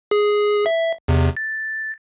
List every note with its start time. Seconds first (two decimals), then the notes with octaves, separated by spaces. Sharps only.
0.11 G#4
0.66 E5
1.08 E2 C3
1.37 A6